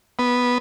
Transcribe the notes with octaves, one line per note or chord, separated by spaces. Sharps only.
B3